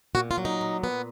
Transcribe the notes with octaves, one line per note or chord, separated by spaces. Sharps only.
A#2 F#4
F4
F#3
D#4
A#2
B3